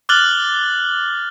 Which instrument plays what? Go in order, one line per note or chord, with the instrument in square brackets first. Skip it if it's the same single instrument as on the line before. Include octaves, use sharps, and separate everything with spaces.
[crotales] D6 F6 F#6 A6 F#7 G7